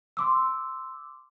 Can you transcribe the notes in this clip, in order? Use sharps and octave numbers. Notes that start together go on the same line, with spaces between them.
C6 D6 E6